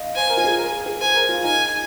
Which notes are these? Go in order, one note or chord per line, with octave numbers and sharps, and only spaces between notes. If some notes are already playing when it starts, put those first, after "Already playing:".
Already playing: D#5 F5
C5 G#5
A#4
F4
G#4
A#4
G#4
C5 G#5
A#4
F4
D#4 G#5